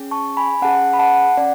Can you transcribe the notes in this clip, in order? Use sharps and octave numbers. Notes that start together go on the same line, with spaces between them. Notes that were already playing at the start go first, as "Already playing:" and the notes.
Already playing: C#4 G#4
A5 C#6
G#5 B5
C#4 G#4 F#5 A5
B5
F#5 A5
C#4 D5 F#5